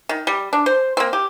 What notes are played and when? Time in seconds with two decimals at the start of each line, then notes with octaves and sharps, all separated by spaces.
0.09 D#3
0.27 G3
0.53 D4
0.66 C5
0.97 A#3 C4
1.13 G4